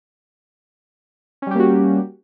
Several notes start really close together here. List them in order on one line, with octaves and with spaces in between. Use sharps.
C#4 G3 G4 A#3 F#4